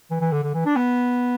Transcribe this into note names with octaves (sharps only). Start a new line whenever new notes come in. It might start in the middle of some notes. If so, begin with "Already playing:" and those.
E3
E3
D3
D3
E3
D4
B3